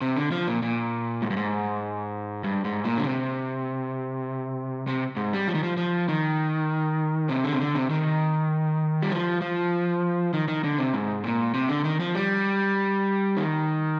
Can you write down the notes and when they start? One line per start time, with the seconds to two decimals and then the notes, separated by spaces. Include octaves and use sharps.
0.01 C3
0.17 D3
0.31 F3
0.47 A#2
0.62 A#2
1.22 G#2
1.30 G2
1.37 G#2
2.44 G2
2.65 G#2
2.85 A#2
2.98 D3
3.04 C3
4.87 C3
5.17 G#2
5.33 G3
5.48 F3
5.55 D#3
5.63 F3
5.77 F3
6.09 D#3
7.29 C3
7.44 D3
7.53 C3
7.60 D3
7.75 C3
7.90 D#3
9.02 G3
9.11 F3
9.41 F3
10.34 D#3
10.48 D#3
10.64 D3
10.78 C3
10.94 G#2
11.24 A#2
11.54 C3
11.69 D3
11.84 D#3
12.00 F3
12.15 G3
13.37 D#3